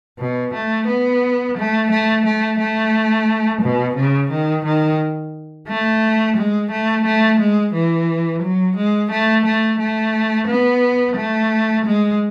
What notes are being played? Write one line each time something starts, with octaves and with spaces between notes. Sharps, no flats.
B2
A3
B3
A3
A3
A3
A3
B2
C#3
D#3
D#3
A3
G#3
A3
A3
G#3
E3
F#3
G#3
A3
A3
A3
B3
A3
G#3